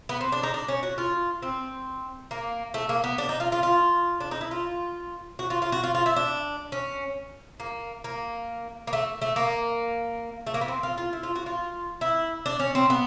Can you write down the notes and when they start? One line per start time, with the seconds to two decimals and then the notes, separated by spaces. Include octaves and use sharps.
0.09 B3
0.21 C4
0.32 D4
0.43 D#4
0.54 D4
0.68 C#4
0.83 F#4
0.98 F4
1.42 C4
2.31 A#3
2.74 A3
2.89 A#3
3.04 B3
3.18 D4
3.29 D#4
3.40 F4
3.52 F4
3.63 F4
4.20 D4
4.31 D#4
4.41 E4
4.51 F4
5.39 F#4
5.50 F4
5.62 F4
5.72 F#4
5.84 F4
5.95 F4
6.06 E4
6.16 D4
6.72 C#4
7.60 A#3
8.04 A#3
8.87 A#3
8.93 A3
9.22 A3
9.36 A#3
10.47 A3
10.54 A#3
10.61 B3
10.68 C4
10.83 F4
10.98 F4
11.13 E4
11.23 F4
11.36 F#4
11.46 F4
12.01 E4
12.46 D4
12.60 C#4
12.75 C4
12.90 B3